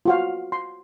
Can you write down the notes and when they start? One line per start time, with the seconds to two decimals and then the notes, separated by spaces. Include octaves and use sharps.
0.05 F4 F#4 F5
0.52 C6